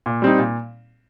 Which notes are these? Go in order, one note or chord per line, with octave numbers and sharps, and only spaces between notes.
A#2
G3 C4 D#4
A#2